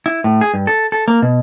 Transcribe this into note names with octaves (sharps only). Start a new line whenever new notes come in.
E4
A2
G#4
G2
A4
A4
A#3
B2